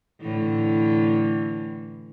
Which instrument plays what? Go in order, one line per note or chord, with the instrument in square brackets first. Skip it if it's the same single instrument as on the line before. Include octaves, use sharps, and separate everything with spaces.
[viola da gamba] A2 D3 E3